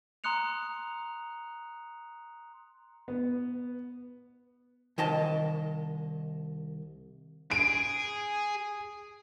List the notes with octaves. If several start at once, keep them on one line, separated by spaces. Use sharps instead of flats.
A#5 C6 D#6 F#6 C#7 F7
B3
C2 D#3 D#5 A5
G#4 D7